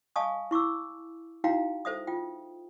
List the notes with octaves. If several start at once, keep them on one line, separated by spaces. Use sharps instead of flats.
D#5 F5 G#5 A5 C#6 D#6
E4 C#6 D6 E6
D#4 E4 F#4 F5 G5 A#5
A4 C5 E5 D#6
F4 G5